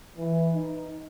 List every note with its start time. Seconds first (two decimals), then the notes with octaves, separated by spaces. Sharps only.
0.18 E3
0.55 D#4